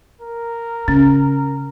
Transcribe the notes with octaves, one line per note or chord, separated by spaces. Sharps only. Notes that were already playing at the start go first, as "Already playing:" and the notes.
A#4
C#3 C#4